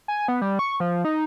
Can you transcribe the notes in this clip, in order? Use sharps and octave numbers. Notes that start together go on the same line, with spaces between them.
G#5
B3
G3
C#6
F3
D#4